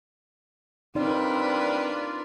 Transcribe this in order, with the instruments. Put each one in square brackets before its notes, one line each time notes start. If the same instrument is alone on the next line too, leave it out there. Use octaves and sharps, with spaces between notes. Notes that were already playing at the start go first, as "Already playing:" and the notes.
[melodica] G3 F4 [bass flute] C4 [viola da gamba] D4 A#4 B4 [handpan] D#4 D5
[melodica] F4 D5